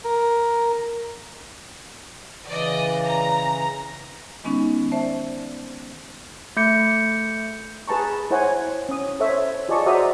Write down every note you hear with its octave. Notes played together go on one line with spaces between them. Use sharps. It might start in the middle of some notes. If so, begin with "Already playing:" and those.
A#4
C#3 E3 D5 D#5
A#5
D#3 G#3 B3 C#4 D#4
C5 D5 E5 A5
A3 G6 C#7
G#4 B4 A5 A#5 C#6
E4 C5 C#5 F#5 G#5
C#4 D#6
A4 C5 C#5 E5
F4 G#4 D5 D#5 A5 C#6
F#4 C5 D5 E5 A#5 D#6